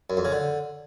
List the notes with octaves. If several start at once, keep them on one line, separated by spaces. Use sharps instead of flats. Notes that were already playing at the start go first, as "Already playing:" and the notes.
F#2
F2
C#3
D3